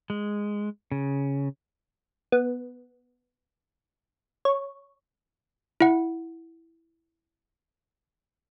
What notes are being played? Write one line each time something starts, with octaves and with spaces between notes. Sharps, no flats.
G#3
C#3
B3
C#5
E4 F#5